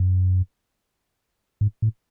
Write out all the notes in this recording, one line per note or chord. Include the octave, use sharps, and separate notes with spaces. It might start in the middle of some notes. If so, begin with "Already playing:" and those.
Already playing: F#2
G#2
A2